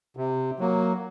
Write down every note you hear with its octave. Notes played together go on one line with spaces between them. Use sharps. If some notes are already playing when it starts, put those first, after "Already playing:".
C3
F#3 A#3